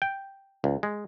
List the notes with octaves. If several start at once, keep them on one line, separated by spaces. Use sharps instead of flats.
G5
C#2
G#3